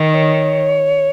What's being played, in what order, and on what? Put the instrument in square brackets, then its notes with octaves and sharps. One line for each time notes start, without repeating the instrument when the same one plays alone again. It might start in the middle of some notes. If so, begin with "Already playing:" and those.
Already playing: [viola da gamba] D#3
[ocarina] D#5
C#5